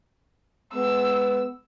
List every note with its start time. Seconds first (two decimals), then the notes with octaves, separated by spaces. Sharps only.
0.74 G#3 B3 E6